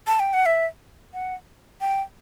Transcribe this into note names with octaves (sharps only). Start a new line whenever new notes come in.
A5
G5
F#5
E5
F#5
G5